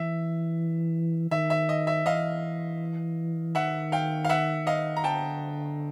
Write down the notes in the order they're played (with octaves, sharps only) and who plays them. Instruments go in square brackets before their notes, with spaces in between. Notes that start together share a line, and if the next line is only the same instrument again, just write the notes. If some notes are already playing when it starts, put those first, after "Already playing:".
Already playing: [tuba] E3 [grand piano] E5
[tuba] D#3 [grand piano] E5
[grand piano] E5
D#5
E5
[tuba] E3 [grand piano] D#5 F5
[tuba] D#3 [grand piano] E5 F#5
[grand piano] F5 G5
F5
E5 F#5
D#5 F5
A#5
[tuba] D3 [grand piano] G5 A5